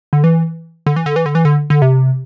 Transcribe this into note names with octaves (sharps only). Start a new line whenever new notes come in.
D3
E3
D3
E3
D3
E3
D3
E3
D3
D3
C3